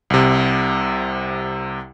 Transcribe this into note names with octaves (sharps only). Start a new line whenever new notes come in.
C2 C3